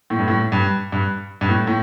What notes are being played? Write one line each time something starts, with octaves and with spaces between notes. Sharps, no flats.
A2
G2
A2
G2
G2
G2
A2
A2